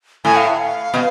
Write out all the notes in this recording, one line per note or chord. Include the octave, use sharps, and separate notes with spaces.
A2 G#5
F5
E5
F5
B2